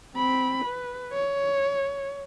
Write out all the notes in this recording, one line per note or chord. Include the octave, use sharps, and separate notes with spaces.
C4 B5
B4
C#5